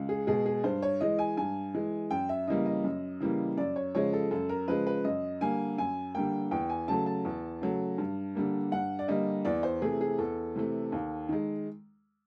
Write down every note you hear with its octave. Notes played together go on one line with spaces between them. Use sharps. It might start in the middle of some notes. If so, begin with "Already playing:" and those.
Already playing: C#2
G#4
B2 G#3 G#4
G#4
G2 C5
C#5
E3 G#3 D#5
G#5
G2 G#5
E3 G#3
F#2 G5
E5
C#3 E3 G3 A#3 D#5
D#5
F#2
C#3 E3 G3 A#3
F#2 D5
C#5
C#3 F3 G#3 C#5
A4
F#2 A4
A#4
C#3 F3 G#3 B4
B4
F#2 D#5
D3 G3 A#3 G#5
F#2 G#5
D3 G3 A#3 G5
E2 G5
G#5
C#3 F#3 A3 A5
A5
E2
C#3 F#3 A3
G2
D3 G3 A#3
G2 F#5
D5
D3 G3 A#3 D#5
E2 D5
C5
C3 E3 A3 G#4
G#4
E2 A4
C3 E3 A3
D#2
D#3 G#3